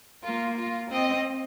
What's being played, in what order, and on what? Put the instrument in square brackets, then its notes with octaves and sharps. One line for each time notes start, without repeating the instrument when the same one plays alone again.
[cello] A#3 [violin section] F4
[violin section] F4
[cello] C4 [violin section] D#5